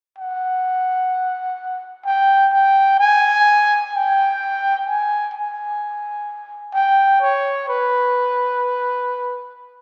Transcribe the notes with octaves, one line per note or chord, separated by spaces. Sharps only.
F#5
G5
G5
G#5
G5
G#5
G#5
G5
C#5
B4